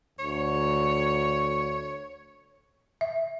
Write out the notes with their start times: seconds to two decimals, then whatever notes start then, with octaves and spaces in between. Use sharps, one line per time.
0.19 D2 C#5
3.01 E5